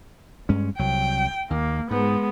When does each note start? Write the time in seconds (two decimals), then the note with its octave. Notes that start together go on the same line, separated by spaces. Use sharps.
0.49 G2 G#3 C#4
0.79 C2 F#3 G5
1.50 D#2 A#3
1.91 G#2 G#3 B3